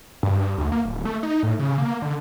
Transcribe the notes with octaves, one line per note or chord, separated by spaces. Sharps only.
G2
G2
D2
A#3
D1
A3
D#4
A2
C#3
A#3
D3